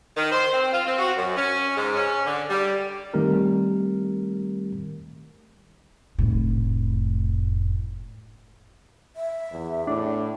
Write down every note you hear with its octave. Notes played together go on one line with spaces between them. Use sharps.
D#3
C5
C4
F4
C4
F#4
F#2
C#4
G#2
C#4
D3
G3
D#3 G3 A3 C4 G4 A#4
F1 A2
E5
E2
A2 D4